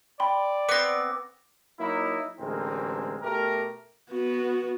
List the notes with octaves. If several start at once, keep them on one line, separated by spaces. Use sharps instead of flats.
D5 G5 B5 C6
B3 C4 D6 A#6
F#3 A#3 D#4 E4
A1 D2 G#3 C4 A#4
B2 A3 G4 A#4
B3 F#4